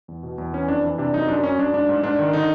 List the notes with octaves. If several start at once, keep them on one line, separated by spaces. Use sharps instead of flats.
E2
B2
E2
E3 C#4
F2 D4
E3
C3 D4
F#2 D#4
F#2 D4
F#2 C#4
F#2 D4
G#2 D4
G#2
G#2 D4
D#3
D3 D#4